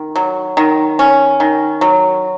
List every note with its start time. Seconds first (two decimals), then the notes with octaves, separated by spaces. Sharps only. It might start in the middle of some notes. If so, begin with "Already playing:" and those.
Already playing: D#3
0.16 F#3
0.57 D#3
0.99 C#4
1.40 D#3
1.81 F#3